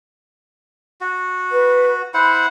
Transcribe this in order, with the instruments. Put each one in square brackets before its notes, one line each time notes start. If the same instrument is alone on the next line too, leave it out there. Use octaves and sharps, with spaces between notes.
[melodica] F#4
[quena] B4
[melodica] E4 C5 F#5 [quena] B5